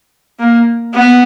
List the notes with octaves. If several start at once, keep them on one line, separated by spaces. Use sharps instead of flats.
A#3
B3